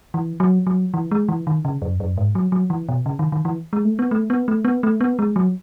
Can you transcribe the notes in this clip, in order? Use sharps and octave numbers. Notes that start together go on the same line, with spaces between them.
E3
F#3
F#3
E3
G#3
E3
D#3
C#3
F#2
F#2
G#2
F#3
F#3
E3
B2
C#3
D#3
D#3
E3
G#3
A3
B3
A3
B3
A3
B3
A3
B3
G#3
F#3